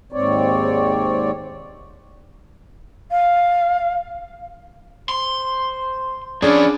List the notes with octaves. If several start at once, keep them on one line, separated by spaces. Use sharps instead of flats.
D#2 G#2 C4 C#5 D5
F5
C5 C6
F3 B3 C#4 D4 G#4 D5